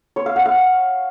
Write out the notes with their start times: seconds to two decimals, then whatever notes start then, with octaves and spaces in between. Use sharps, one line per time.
0.16 C#5
0.26 F5
0.36 F#5
0.46 F5